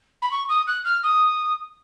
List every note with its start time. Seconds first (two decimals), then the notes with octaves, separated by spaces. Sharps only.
0.22 B5
0.31 C#6
0.49 D#6
0.67 F#6
0.85 F6
1.03 D#6